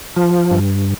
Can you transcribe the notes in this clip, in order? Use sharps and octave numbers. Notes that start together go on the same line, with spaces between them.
F3
G2